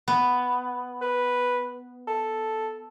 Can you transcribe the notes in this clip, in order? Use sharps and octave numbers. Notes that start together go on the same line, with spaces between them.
B3
B4
A4